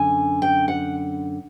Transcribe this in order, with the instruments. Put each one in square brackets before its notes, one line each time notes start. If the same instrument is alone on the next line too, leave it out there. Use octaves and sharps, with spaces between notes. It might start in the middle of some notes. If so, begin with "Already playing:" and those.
Already playing: [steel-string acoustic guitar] F#2 D3 G#5
G5
F#5